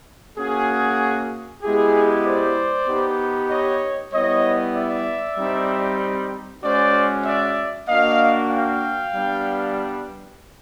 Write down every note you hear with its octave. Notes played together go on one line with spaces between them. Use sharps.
A#3 C#4 F#4 G#4
G#3 B3 E4 G4 G#4
C5 D5
B3 D#4 G4
C#5 D#5
G3 B3 E4 C#5 D#5
D5 E5
G3 C4 D#4
G#3 C#4 F#4 C5 D5
D5 E5
A#3 D4 F#4 D#5 F5
F5 G5
G3 B3 D4